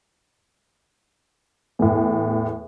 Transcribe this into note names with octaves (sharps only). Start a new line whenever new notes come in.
E2 A2